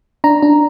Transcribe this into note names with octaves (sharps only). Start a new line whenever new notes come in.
D4 A#5
D4